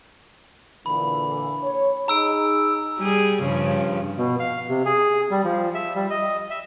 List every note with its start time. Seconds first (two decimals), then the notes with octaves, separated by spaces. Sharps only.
0.86 A#2 D3 E3 B5
1.63 C#5
2.08 D#4 G#4 A#5 E6 D7
2.99 G3 G#4
3.40 G2 C#3 F3
4.18 B2
4.40 F5
4.69 C3
4.86 G#4
5.31 G3
5.45 F3
5.74 E5
5.95 G3
6.10 D#5
6.51 E5